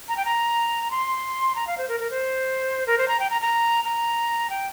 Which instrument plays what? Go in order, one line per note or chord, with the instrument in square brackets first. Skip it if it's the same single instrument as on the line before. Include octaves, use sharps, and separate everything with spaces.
[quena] A#5
G5
A#5
C6
A#5
F5
C5
A#4
A#4
C5
A#4
C5
A#5
G5
A#5
A#5
A#5
G5